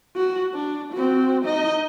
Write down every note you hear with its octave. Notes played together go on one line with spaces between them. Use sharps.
F#4
D4
C4 F#4
D#4 D#5